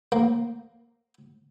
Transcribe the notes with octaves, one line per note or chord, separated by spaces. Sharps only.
A#3